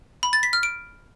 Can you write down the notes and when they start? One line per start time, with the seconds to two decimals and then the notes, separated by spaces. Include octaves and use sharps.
0.23 B5
0.33 A6
0.43 B6
0.53 F6
0.63 D7